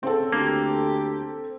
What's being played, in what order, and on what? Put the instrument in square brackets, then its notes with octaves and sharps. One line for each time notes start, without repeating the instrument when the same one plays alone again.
[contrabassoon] C#3 [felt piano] C4 A4
[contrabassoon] D2 [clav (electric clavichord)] A#3 [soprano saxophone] G4